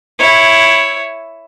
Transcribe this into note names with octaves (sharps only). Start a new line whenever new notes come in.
E4 C#5